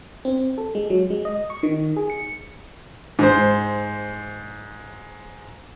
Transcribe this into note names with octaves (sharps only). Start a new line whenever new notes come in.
C4
A4
G#3
F#3
G#3
D#5
C#6
D#3
G#4
C#7
G#2 C5